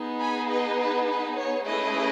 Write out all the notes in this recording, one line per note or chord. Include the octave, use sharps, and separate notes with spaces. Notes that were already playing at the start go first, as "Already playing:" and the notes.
Already playing: B3 D#4 G#4
G#5 B5
B4 D#5
B4
B4
C#5
A3 C#4 E4 G#4 B4 D#5